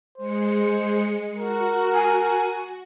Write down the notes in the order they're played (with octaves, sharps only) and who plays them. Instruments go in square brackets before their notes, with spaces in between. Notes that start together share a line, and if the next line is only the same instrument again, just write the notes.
[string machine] G#3 C#7 [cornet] C5
[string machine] F#4 [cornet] A#4
[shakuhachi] G#5